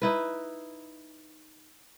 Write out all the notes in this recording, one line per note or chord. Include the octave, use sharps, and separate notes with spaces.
D#4 E4 B4